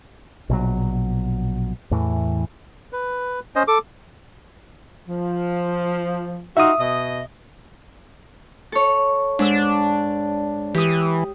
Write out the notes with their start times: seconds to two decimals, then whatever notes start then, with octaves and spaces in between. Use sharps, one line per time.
0.50 A#1 B2 F#3
1.91 E2 A2 E3
2.92 B4
3.56 C#4 C5 D#5
3.68 A4 D6
5.08 F3
6.57 D#4 F4 F#4 E5 D#6
6.80 B2 D#5
8.72 A4 C#5
9.39 G#2 D4 E6
10.75 E3 G4 D#6